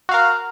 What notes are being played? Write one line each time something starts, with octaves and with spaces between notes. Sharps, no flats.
F#4 A#4 F5